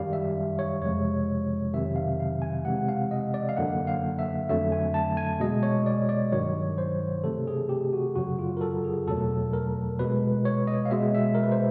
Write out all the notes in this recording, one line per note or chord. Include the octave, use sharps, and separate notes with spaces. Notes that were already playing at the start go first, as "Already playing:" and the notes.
Already playing: F#2 D#3 G3 F5
E5
C#5
F2 C3 F3 G#3 C#5
F2 C3 D#3 F#3 E5
F5
F5
G#5
C3 E3 G#3 F#5
F5
D#5
D5
F5
F#2 D3 F#3 A#3 F#5
F5
E5
F2 D3 F#3 A3 E5
G#5
A5
G#5
B2 G#3 D#5
C#5
D5
D5
G2 D#3 F#3 C#5
C5
C3 E3 A3 A4
G#4
G4
F#4
F#2 C#3 F#3 F#4
F4
A#4
A4
G#4
E2 B2 F#3 A3 A4
A#4
B2 G#3 B4
C#5
D#5
F5
B2 G#3 E5
E5
A#4
B4
C5